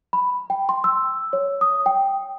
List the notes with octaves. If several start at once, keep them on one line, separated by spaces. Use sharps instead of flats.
B5
G5
C6
E6
C#5
D#6
G5